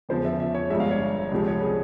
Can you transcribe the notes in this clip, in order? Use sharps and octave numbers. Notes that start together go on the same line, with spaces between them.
E2 C#3 F3 C5
E5
E5
C#5
G1 G2 F3 G#3 E5
F5
C#5
C#2 C3 F3 G#3
C#5
G#4